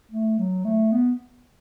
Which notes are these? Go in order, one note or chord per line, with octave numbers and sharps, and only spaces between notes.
A3
F#3
A3
B3